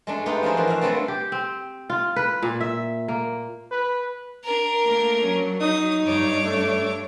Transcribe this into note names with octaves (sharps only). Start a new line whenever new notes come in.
G#3 A3 D4
G#3 A3 B3 D#4 F4 G4
F3 D4 G#4 A#4 C5
E3 F3 F#4
F#4 E5 F5
F#3 A3 B3 C4 D4 A4
G4
C4
F4
B4
A#2
E5
A#3
B4
D4 A#4
A3 A#3
F#3 C#4
D#4 D#6
G2 D4 C#5 D6
A3